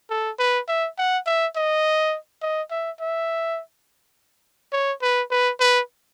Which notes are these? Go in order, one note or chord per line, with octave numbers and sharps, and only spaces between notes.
A4
B4
E5
F#5
E5
D#5
D#5
E5
E5
C#5
B4
B4
B4